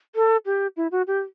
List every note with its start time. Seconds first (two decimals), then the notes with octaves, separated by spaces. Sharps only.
0.15 A4
0.46 G4
0.77 E4
0.92 F#4
1.07 G4